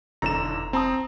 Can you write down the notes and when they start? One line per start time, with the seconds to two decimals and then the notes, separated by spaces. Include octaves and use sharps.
0.22 F1 B1 E2 D3 A#5 E7
0.73 C4 A5 A#5 D#6